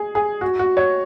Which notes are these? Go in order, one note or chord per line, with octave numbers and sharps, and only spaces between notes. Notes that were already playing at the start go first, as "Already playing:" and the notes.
Already playing: G#4
G#4
F#4
F#4
C#5